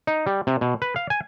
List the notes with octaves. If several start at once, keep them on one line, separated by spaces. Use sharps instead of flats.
D#4
G3
C3
B2
B4
F5
G#5